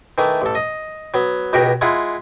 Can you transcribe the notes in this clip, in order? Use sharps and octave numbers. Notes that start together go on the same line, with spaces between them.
D#3 E3 A3
A1 A4
D#5
F#3 B3
C#2 B2 F#4 G4 A#4
G#3 E4 F4 F#5